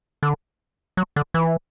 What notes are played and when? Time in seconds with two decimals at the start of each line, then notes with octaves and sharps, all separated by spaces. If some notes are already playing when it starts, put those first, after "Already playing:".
0.23 D3
0.97 F#3
1.16 D3
1.34 E3